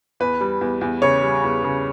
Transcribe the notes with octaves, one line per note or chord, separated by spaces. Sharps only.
E2 B4
G3
E2
E2
C#3 C#5
G3
E2
C#3